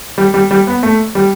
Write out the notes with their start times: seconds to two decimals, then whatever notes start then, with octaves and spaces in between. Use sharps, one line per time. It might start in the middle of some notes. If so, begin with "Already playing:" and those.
0.18 G3
0.34 G3
0.51 G3
0.67 B3
0.83 A3
1.15 G3